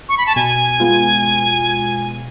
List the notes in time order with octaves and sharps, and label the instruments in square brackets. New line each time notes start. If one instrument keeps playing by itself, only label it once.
[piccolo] C#6
B5
A5
[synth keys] B2 [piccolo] G#5
[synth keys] G#3 B3 F4